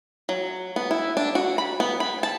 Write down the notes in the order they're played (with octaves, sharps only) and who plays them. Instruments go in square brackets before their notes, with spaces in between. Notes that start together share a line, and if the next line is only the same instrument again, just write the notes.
[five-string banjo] F#3
B3
E4
D4
F#4
B5
B3
B5
A5